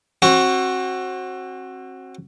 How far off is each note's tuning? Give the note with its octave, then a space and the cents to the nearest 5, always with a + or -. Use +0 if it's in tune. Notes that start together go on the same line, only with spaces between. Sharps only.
C4 +35 F#4 +0